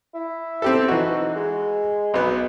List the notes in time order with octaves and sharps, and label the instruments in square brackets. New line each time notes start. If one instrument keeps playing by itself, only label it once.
[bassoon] E4
[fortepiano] C4 G4 A4
[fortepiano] E3 F#4 [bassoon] D#4
[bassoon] G#3
[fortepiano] B1 B3 [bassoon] B2